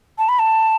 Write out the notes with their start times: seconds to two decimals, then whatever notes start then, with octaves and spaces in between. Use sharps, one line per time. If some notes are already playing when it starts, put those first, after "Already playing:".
0.18 A5
0.29 B5
0.39 A5